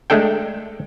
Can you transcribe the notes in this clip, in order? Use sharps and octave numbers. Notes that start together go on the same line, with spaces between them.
G#3 A3 D4 A4 G5